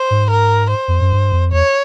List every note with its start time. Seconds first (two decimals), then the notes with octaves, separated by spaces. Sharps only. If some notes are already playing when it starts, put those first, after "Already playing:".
Already playing: C5
0.11 G#2
0.31 A#4
0.71 C5
0.88 F2
1.01 F#2
1.13 G2
1.32 F2
1.52 E2 C#5